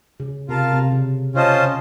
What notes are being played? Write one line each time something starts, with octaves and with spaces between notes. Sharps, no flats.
C#3
C3 F4 A#4 F5 A5
C3
C#3
C#3 C#4 F4 C5 D#5 A5
C#3